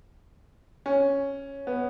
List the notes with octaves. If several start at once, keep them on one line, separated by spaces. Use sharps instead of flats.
C#4
B3